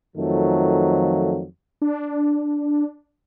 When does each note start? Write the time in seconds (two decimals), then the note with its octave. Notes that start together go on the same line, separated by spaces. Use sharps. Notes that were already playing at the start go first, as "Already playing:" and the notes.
0.16 F2 D#3 F3 F#3 A3
1.82 D4